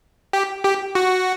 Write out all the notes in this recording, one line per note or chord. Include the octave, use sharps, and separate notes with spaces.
G4
G4
F#4